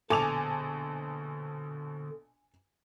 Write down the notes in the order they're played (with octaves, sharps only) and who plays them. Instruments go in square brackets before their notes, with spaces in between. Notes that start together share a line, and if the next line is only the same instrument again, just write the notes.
[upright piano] A#1 B2 A5 [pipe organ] D3 [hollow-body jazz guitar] A4 [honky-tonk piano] G#5 D6 F7